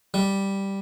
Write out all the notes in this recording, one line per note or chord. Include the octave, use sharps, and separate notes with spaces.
G3